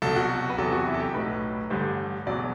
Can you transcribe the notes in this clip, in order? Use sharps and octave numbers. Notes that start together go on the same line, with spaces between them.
C2 B2 F#3 A4
F#4
B4
E2 C3 F#3 A4
F#4
E4
A4
G4
B1 A2 F#3 B4
A1 G2 D3 G3 C5
E1 E2 B2 F#3 D5